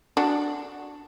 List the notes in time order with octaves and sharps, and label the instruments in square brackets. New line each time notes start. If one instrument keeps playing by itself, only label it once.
[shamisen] D4 F#4